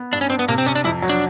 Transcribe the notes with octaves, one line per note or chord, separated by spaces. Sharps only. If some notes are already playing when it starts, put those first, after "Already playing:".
Already playing: B3
G2 D4
C#4
C4 D4
B3
C3 A#3
C4
C3 C#4
D4
F2 E4
F#3
D4